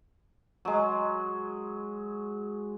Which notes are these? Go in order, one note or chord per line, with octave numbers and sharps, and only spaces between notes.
F#3 G#3